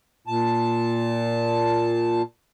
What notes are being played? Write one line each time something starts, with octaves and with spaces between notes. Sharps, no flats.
A#2 A5